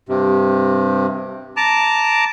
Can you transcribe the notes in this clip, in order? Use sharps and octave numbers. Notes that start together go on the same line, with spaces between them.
G2 C3
A5 A#5 D6